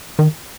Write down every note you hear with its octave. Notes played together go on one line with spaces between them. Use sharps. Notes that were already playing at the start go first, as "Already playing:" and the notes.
D#3